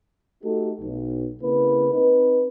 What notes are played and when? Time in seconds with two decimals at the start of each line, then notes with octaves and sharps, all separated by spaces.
0.43 A3 D#4 F#4 G4 A4
0.81 B1
1.43 C#3 A#3 C4 E4 B4
1.93 C4 D#4 B4